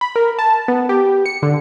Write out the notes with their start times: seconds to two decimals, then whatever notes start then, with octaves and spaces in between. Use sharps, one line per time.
0.01 B5
0.16 A#4
0.39 A5
0.68 B3
0.89 G4
1.26 C#7
1.43 D3